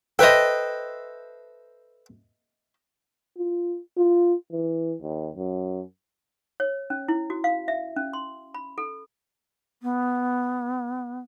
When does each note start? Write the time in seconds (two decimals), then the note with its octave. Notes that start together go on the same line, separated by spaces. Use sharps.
0.19 A4 B4 C5 D#5 E5 G5
3.37 F4
3.97 F4
4.51 E3
5.01 D#2
5.36 F#2
6.60 C#5
6.90 C#4
7.08 E4
7.30 F#4
7.44 F5
7.68 E5
7.96 C#4
8.13 C6
8.54 B5
8.78 A4
9.83 B3